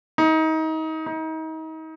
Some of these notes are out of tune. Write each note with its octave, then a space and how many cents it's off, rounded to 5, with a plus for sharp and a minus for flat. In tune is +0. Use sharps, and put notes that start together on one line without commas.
D#4 +30
D#4 +35